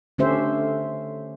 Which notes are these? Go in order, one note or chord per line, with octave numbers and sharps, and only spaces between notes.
D3 A3 C#4 G4 C5 E5